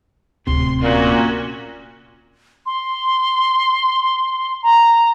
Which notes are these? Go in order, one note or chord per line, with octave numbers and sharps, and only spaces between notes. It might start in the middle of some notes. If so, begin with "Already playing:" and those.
D1 D2 C3 C6
A#2 C#4 F#4
C6
A#5